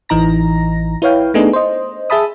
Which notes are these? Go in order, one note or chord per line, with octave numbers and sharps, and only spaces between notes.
A1 E3 D#4 A#5 A#6
E4 B4 C#5 F5 G5
A3 B3 D4 D#4 G#4
C5 D#5
G#4 E5 A5 B5 D#6